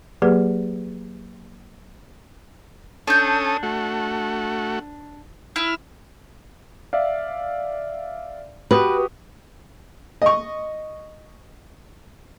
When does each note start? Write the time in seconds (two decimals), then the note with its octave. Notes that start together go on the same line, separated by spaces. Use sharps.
0.22 F#3 A#3 G4 G#4 B4
3.07 C#4 D4 A4 D#6 G6
3.63 A3 F#4
5.56 E4 E6 F6
6.93 D5 E5 F5
8.71 F#4 G4 B4 D#6
10.22 D#5 C#6